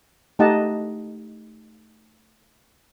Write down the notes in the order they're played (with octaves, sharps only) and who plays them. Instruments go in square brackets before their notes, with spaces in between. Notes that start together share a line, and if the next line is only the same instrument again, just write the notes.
[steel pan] A3 D#4 G4 D#5 F#5 A5